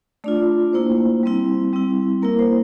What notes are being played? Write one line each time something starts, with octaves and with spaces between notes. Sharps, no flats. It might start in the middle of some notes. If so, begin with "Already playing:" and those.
A3 D4 F4 D5
A#3 E4 C5
G3 C4 E4
G3 C4 E4
A#3 E4 A#4
C5